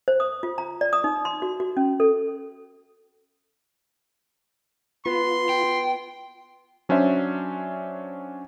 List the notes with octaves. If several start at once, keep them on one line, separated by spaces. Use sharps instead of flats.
C5
D#6
F4
A#5
D5
D#6
D#4
C6
F#4
F#4
C#4
A4
B3 F4 B4 C6
G5
F#3 C#4 D4 C5 E5